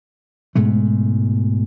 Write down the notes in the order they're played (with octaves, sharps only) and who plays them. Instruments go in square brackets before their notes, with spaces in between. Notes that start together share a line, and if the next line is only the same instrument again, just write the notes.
[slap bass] G#2 B2 G#3 A3